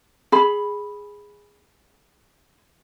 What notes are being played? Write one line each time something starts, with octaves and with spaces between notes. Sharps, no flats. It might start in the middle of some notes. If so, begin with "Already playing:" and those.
G#4 B5